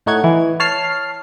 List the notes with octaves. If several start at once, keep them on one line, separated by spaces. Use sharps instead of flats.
A2 A3 D#4 C#5 F#5 G#6
E3
C#5 A5 F6 C7